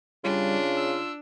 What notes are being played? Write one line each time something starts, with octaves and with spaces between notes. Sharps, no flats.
C#3 G3 D4 F4
E6